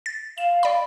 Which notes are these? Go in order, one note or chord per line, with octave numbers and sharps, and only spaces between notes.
A6
F5 E7
D5 B5